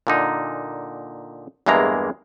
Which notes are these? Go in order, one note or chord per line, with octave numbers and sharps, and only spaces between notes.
A#2 D3 D#4
E2 G2 E3 G#3 A#3 A#5